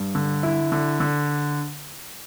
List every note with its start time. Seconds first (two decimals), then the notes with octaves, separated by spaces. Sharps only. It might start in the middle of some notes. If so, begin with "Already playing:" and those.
Already playing: G2
0.15 D3
0.43 E4
0.72 D3
1.00 D3